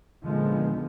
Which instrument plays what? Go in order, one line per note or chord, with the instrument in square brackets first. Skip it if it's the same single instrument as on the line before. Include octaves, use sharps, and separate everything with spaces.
[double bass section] A#2 D3 D#3 F3 G#3 B3